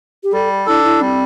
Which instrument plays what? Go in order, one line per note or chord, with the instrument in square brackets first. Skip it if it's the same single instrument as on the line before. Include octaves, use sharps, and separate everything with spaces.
[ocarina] G4
[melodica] G3 [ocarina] A4
[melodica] D4 A4 [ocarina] E4
[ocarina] E4
[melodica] G3 [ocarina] C4